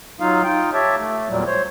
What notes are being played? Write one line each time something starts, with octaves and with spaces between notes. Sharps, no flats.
F#3 D#4 F4 F5
D#4 F4 G5
G4 C#5 E5 A5
A3
E2 A#2 F#3 G3
C5 C#5